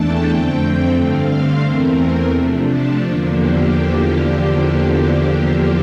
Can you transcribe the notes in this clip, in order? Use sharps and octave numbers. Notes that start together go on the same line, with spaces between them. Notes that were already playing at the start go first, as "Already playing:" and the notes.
Already playing: E2 E3 A3 D4 G5 A5
F2 D3 A3 C4 G5
G5
G2 D3 A3 C4 F5
C5
E2 E3 A3 C4 A#4
C3 F3 A3 D4 G4
A4
E2 D3 F3 A#3 D4 F4
G4